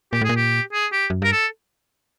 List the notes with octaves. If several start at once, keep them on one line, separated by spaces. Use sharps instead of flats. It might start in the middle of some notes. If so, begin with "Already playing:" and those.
A#2 G4
A2 G#4
A#2
G4
G#4
G4
F#2
G2 A#4
A4